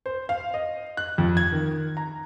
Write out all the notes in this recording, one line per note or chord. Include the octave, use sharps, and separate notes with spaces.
C5
F5
D#5
F#6
F2
G#6
D#3
A#5